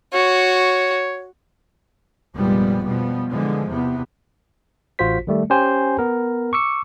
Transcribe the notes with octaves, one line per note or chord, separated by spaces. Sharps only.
F#4 C#5
F1 A#2 F3 G3 G#3 B3
B2 F3 G3 B3
D3 E3 F3 G#3
E2 C3 B3
A1 F4 F#4 C5 B6
D#3 G3 A3
C#4 G4 C5 G5 G#5
B3 A#4
C#6 D6 E6 C#7